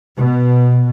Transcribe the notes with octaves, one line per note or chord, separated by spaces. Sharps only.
B2